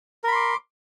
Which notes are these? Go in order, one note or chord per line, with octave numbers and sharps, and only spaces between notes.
A#4 B5 C6 D6